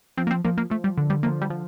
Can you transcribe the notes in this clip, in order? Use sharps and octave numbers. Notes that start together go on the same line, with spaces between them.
F3 C4
A#3
C4
F3 A#3
A#3
F3 A3
G3
D3
G3
F3 A#3
G3
F3